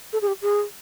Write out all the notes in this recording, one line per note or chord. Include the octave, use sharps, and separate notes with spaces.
A4
G#4
G4
G#4